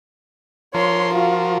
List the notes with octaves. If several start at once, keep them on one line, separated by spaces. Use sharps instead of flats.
F3 A#4 C5 C#5 C6
F4 F#4